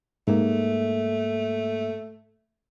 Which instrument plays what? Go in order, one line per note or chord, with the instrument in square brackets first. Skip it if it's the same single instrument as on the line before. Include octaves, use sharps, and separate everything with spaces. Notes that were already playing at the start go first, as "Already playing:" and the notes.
[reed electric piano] G#2 A#3 [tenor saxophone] A3